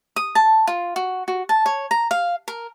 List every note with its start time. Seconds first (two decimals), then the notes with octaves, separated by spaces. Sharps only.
0.16 D#6
0.35 A5
0.67 F4
0.96 F#4
1.28 F#4
1.49 A5
1.66 C#5
1.91 A#5
2.11 F5
2.48 A#4